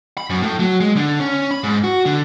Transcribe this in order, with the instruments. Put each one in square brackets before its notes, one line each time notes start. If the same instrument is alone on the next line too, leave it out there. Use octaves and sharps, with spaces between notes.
[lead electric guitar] B5
F#2
A2
F#3
G#3
D3
C#4
B5
G#2
F#4
D3